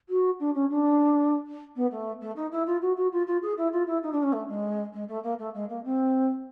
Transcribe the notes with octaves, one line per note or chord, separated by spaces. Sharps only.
F#4
D4
C#4
D4
B3
A3
A3
D#4
E4
F4
F#4
F#4
F4
F4
G#4
E4
F4
E4
D#4
D4
C#4
A3
G#3
G#3
A3
A#3
A3
G#3
A#3
C4